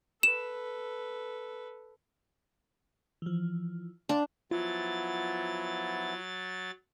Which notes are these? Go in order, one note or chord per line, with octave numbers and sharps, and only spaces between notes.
A4 B4 E7
E3 F3
D4 F5 G5 C6
F3 F#3 B3 E4 F4 A6